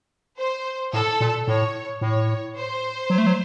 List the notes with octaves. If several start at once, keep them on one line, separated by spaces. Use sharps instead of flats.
C5
A2 A4
A#2
A2 C#5
A2 C#5
C5
F#3
A3
F#3